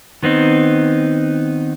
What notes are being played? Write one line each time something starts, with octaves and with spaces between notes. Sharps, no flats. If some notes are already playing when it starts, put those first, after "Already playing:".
D#3 B3 C4 D#4